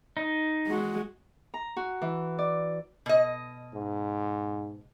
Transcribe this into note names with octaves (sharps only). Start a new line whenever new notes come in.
D#4
G#3 F#4
A#5
F#4
E3
D5
B2 D#5
G#2